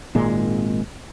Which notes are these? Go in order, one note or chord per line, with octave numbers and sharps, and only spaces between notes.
G#1 A#2 G#3